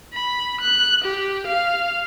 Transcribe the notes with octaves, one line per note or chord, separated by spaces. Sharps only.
B5
F#6
G4
F5